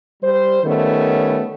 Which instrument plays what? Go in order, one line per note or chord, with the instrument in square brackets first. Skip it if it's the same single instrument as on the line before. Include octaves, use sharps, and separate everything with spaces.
[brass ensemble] G3 C5
D#3 G3 A3 B3 C#4